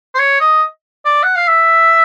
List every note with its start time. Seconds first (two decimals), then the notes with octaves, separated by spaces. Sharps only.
0.15 C5
0.19 C#5
0.41 D#5
1.05 D5
1.23 F#5
1.36 F5
1.47 E5